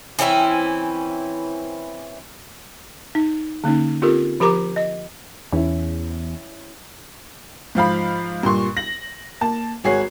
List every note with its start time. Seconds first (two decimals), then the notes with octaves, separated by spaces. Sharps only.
0.19 E3 C4 C#4 E4
3.15 D#4
3.64 D3 A#3 C#4 D#4
4.02 C4 F4 G4 A4 A#4
4.40 F3 G4 A#4 A#5 D6
4.76 D#5
5.52 E2 C#4 E4
7.75 G#2 F3 F5 B5
8.43 G2 A#2 C6 C#6
8.77 A#6 F#7
9.41 A#3 A5
9.84 G#1 F#4 G#4 C#5 C7